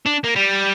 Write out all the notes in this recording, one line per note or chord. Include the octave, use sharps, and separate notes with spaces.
D4
A#3
G3